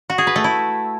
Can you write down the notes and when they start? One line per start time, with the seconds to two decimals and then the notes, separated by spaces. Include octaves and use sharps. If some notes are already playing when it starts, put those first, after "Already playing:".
0.10 F#4
0.18 G#4
0.27 B4
0.36 A3
0.44 E4